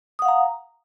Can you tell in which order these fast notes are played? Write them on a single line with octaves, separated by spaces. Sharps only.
D#6 F#5 F5 A#5